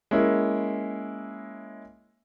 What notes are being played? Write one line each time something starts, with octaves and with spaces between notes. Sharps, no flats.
G#3 A#3 C#4 E4